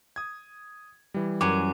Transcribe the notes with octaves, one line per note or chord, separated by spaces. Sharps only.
D#6 G#6
E3 G3
F#2 G#5 D6